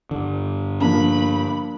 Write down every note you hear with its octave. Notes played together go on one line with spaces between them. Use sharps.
G2 D3
F3 A#3 D4 B5